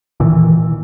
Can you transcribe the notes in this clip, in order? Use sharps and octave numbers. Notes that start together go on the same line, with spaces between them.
A#2 D#3 E3